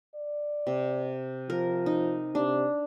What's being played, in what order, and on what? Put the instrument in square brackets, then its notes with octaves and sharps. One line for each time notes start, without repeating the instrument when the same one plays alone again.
[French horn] D5
[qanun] C3
[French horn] F3 [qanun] A#4
[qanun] D#4
[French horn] C3 [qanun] D4